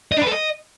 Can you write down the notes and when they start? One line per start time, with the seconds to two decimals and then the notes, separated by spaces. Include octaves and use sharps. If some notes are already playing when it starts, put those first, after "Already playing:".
0.12 D#5
0.17 D4
0.22 B4
0.27 A4
0.32 D#5